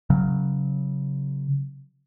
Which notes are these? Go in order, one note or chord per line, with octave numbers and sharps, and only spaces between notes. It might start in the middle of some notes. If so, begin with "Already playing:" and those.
C#3 F#3